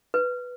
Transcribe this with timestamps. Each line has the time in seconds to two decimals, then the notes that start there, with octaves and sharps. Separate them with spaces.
0.14 B4